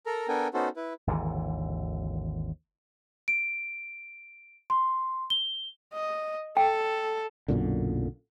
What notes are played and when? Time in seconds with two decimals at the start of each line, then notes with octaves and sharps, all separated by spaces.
0.06 A4 A#4 A#5
0.28 B3 D4 A4 A#4 G5 G#5
0.54 B3 C#4 D#4 F#4 A4 C5
0.76 E4 B4
1.07 G#1 D#2 D3 E3
3.28 D7
4.70 C6
5.30 G7
5.93 D#5
6.57 A4 G5
7.48 B1 F#2 A#2 D3